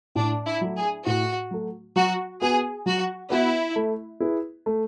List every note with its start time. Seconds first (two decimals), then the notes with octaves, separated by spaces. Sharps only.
0.15 A2 D4
0.45 E4
0.61 F#3 A3
0.77 G#4
1.06 A2 F#4
1.51 F#3 A3
1.96 F#3 F#4
2.41 B3 F#4 G#4 B4
2.86 F#3 F#4
3.30 B3 E4 F#4 B4
3.76 A3
4.20 E4 G#4 B4
4.66 A3